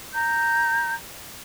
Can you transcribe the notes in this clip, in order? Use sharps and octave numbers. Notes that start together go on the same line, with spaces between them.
A#5 G6